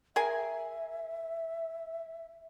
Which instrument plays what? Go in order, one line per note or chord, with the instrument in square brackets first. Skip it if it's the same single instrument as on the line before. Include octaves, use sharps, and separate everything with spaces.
[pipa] G#4 A#4 G#5 [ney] E5